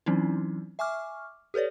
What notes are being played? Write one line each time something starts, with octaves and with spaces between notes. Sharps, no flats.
E3 F#3 C4 C#4 D#4 E4
E5 G#5 C#6 D6 F6
G4 A4 B4 C#5 D5